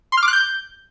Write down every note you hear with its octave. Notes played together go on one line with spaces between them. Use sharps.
C6
F6
D6
F#6
G6